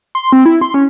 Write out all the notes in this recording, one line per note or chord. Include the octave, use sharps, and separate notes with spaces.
C6
C4
E4
C6
C#4